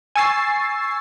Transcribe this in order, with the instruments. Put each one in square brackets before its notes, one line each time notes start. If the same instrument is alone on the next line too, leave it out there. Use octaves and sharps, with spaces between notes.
[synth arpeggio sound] G#5 C#6 E6 A6 C7